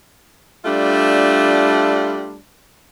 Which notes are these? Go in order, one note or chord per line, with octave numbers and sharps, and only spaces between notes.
G3 A3 D4 F4